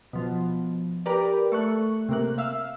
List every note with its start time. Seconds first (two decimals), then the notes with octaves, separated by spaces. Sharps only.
0.13 B2 F3
1.06 G4 A#4 B4 D5
1.52 A3 C#6 F#6
2.09 C3 A#3 F#6
2.38 E5 F5 E6